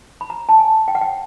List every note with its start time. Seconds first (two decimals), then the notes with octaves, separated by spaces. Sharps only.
0.21 B5
0.30 A#5
0.49 A5
0.59 G#5
0.88 G5
0.95 F#5
1.01 G5